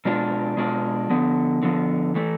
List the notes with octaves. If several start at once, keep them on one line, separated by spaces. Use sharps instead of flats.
B2 G#3 D4 F4
B2 G#3 D4 F4
D3 F3 B3
D3 F3 B3
E3 A3